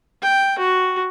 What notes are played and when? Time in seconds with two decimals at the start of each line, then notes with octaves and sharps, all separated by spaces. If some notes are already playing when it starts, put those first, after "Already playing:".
0.22 G5
0.58 F#4